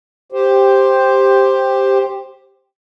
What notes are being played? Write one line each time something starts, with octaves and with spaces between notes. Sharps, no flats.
G4 C5